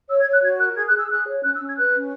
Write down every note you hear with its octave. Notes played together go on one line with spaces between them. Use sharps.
C#5 E6
G#6
C#5
F#6
F#4 G#6
A#4 F#6
G#4 G#6
F#6
G#4
E6
G#4 F#6
C#5
C#4 F#6
E6
C#4
G#6
B4 F#6
C#4